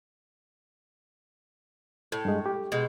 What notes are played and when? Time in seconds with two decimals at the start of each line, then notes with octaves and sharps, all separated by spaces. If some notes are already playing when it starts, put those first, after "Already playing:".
2.12 A2
2.25 G2 G#3
2.46 G4
2.72 B2 G#3